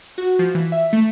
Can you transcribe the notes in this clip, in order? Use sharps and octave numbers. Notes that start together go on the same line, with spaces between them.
F#4
F3
E3
E5
A3